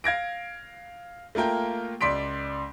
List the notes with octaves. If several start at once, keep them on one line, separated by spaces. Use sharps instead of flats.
F5 G#6 A#6 D7
A3 A#3 F4 A#4 G5
C#2 D5 C6 B6 D7